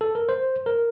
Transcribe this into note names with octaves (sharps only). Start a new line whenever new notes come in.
A4
A#4
C5
A#4